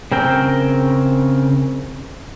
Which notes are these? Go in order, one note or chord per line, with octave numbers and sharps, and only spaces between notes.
C#3 C4 A#4 G5